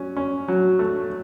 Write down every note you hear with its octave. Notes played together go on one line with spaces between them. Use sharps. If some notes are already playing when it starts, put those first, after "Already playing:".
Already playing: F#3 C#4
C#4
F#3
A3